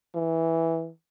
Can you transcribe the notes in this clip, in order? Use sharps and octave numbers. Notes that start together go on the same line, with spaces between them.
E3